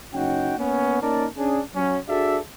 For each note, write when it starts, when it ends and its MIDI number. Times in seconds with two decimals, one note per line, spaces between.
0.14 0.55 30
0.14 0.55 61
0.14 0.55 63
0.14 0.55 66
0.14 0.55 79
0.57 1.00 58
0.57 1.00 59
0.57 1.00 61
1.01 1.26 58
1.01 1.26 61
1.01 1.26 63
1.01 1.26 70
1.01 1.26 74
1.01 1.26 81
1.37 1.61 61
1.37 1.61 62
1.37 1.61 68
1.75 1.98 54
1.75 1.98 61
2.08 2.38 62
2.08 2.38 66
2.08 2.38 68
2.08 2.38 69
2.08 2.38 74
2.08 2.38 76